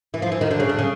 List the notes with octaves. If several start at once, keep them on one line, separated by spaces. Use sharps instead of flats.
E3
F3
E3
D#3
D3
C#3
D3
C#3